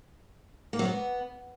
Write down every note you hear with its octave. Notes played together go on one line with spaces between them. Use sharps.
A#3
F#3
B3